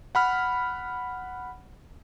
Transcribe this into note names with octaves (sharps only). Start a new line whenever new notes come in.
F#5 B5 F6